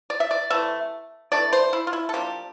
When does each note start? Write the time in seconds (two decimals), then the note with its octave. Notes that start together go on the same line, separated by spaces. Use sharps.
0.10 D5
0.20 E5
0.31 D5
0.50 C3 E3 A3 E5
1.32 E3 A3 D4 D5
1.53 C5
1.73 E4
1.87 F4
1.93 E4
2.09 A4
2.13 F3 A#3 D4 G4